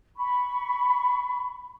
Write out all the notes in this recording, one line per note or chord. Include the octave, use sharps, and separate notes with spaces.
B5 C#6